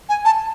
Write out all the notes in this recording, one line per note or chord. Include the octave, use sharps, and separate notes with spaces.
G#5
A5